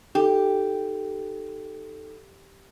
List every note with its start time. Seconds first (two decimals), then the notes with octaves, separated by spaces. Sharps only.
0.15 D#4 G4 A4